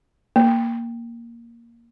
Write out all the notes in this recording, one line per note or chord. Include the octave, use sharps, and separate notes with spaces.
A#3